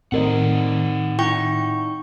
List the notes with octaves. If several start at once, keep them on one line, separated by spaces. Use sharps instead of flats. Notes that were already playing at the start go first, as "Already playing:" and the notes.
A2 D#3 C4 D#4 A#4 D5 D#5 F#5
E4 G5 C#6